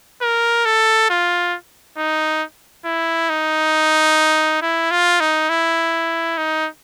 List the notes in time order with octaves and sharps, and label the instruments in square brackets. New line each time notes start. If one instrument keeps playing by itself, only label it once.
[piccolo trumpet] A#4
A4
F4
D#4
E4
D#4
E4
F4
D#4
E4
D#4